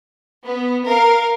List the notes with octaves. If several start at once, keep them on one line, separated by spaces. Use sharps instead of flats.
B3
A#4 F5